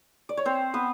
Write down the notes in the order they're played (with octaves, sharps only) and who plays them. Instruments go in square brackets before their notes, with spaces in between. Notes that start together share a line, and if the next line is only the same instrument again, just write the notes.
[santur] D5
C#5
C4 C5
B3 B4